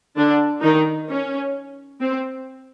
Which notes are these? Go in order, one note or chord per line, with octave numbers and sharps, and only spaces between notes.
D3 D4
D#3 D#4
C#4
C4